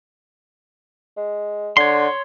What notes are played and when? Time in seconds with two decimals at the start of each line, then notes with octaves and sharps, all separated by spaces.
1.17 G#3
1.77 D3 C#5 C6